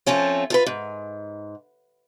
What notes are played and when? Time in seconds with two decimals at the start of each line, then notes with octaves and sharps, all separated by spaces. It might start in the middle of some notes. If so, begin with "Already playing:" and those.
0.06 F3 A3 C4 C#4 F4
0.50 F4 A4 B4
0.66 G#2